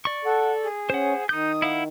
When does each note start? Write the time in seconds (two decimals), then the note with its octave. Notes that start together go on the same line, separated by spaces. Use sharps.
0.05 D5 C#6
0.25 A4 F#5
0.63 G#4
0.90 C#4 C5 F#5
1.29 D#3 D#4 D#6 G6
1.62 E4 F5 F#5